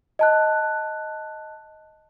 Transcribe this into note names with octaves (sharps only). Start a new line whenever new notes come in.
D#5 A5 F#6